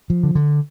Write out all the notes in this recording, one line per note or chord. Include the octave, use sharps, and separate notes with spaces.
F3
D3
D3